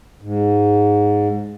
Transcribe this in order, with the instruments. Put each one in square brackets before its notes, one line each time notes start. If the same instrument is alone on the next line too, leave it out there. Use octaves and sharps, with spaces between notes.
[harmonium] G#2